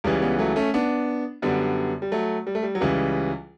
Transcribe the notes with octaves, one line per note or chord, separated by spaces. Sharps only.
C#2 C#3 E3 G3
G3 B3
F#3 A3
A3 C#4
B3 D4
F#2 D3 G3 B3
G3
F#3 A3
G3
A3
G3
F#3
C#2 C#3 E3 G3